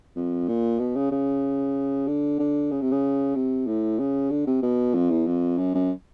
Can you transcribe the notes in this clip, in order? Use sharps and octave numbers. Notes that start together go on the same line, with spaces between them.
F2
A#2
B2
C#3
C#3
D3
D3
C#3
C3
C#3
C3
A2
C#3
D3
C3
B2
F2
E2
F2
F#2
F#2